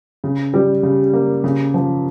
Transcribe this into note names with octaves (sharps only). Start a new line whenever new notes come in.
C#3
G3
C#3
A#3
C#3
F3